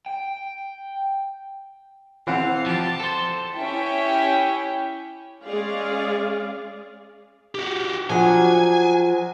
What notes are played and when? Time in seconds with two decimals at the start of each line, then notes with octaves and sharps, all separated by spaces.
0.06 G5
2.27 E3 C4 F5 F#5
2.66 F3 G4 A5
3.00 A4 C5
3.56 C#4 E4 G4 E5 G5
5.46 G#3 C#4 G#4 D5 F5
7.55 F#4 G4
8.10 F3 F#3 D4 G#4 G#5